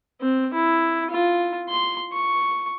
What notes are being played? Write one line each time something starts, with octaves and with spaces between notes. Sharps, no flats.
C4
E4
F4
C6
C#6